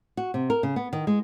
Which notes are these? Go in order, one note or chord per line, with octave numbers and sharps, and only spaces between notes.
F#4
C3
A#4
C#3
B3
D#3
G#3